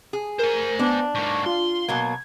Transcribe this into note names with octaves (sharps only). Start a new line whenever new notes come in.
G#4
A#4 C5 G#5
B3 D4
G#2 A#3 C#6
F4 C6
B2 F#3 A#3 G#6